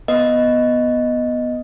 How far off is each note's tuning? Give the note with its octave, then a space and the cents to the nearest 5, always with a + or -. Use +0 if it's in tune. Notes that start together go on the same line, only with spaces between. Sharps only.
B3 +0 B4 +0 D#5 +0